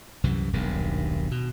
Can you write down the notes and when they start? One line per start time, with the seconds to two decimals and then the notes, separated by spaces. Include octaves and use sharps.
0.24 C2 F#2 C3 E3
0.53 D#1 B1 G2 D#3
1.31 B2